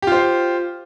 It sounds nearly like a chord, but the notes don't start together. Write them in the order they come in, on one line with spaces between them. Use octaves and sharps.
G4 F4 C5